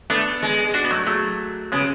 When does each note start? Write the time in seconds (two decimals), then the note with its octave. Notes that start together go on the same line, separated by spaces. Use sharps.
0.10 A3 B3 D4
0.43 G#3
0.74 D4 F#4
0.84 B3
0.91 F#3 A3
1.07 F#3 A3
1.72 C#3 G#3 B3